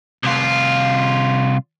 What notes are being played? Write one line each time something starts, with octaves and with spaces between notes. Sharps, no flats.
C2 F4